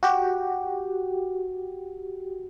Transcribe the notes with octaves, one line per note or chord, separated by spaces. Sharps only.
F#4 G4